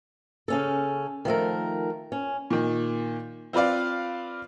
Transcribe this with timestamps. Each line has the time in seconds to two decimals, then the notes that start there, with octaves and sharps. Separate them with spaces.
0.48 C#3 C#4 A4
1.25 D#3 F3 A3 A#4
2.12 C#4
2.50 A#2 D#3
3.53 C4 F4 B4 D5 F5